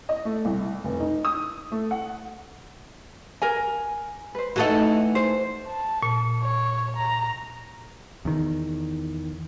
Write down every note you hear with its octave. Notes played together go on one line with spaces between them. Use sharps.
D#5
A3
C2
F1
D#4
D#6
A3
F#5
A#4 G#5
B4 C5
E3 A3 D#4 F#4 A4 F#5
C5
A5
A#2
C#5
A#5
E2 D#3